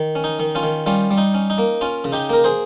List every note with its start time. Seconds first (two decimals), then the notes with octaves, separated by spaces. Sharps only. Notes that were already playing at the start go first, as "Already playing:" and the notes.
Already playing: D#3
0.15 C#4
0.24 D#4
0.39 D#3
0.55 C#4 F4
0.63 D#3
0.86 G3 C#4 F4
1.11 G3
1.18 D#4
1.34 C#4
1.50 D#4
1.58 A#3
1.81 C#4 F4
2.04 C#3
2.12 D#4 G4
2.29 A#3 A#4
2.44 G#4 C5